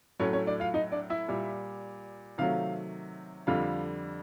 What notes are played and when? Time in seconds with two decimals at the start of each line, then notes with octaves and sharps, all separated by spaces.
0.20 A2 F#3 A3 C#4 C#5
0.33 C#4 C#5
0.47 D4 D5
0.60 F4 F5
0.74 D#4 D#5
0.92 D4 D5
1.10 E4 E5
1.28 A#2 G3
2.38 C3 D#3 F#3 A3 F4 F5
3.47 F2 D3 G3 F4 F5